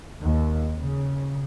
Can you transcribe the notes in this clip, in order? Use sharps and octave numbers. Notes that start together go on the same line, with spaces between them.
D#2
C#3